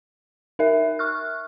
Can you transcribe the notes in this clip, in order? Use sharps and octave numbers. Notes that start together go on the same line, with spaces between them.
D#4 A#4 E5
C#6 F6 F#6